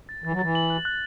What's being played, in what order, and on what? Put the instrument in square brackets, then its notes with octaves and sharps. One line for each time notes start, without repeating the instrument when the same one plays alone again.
[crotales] A6
[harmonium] E3 [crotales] A6
[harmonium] F#3
[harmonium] E3 [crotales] A6
[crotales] F#7
F#6
F#6